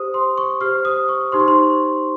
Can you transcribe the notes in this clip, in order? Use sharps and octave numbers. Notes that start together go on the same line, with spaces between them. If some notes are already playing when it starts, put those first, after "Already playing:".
Already playing: G4 C5 D#6
C6
C#6
G4 C5 F6
D#6
C#6
D#4 G4 C5 C6
C#6
C6